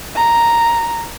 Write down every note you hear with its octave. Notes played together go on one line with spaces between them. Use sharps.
A#5